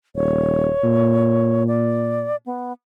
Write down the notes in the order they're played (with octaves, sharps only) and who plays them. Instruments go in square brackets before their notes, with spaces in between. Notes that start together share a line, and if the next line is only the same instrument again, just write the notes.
[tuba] D#1 [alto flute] C#5
[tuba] A#2
[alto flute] D5
B3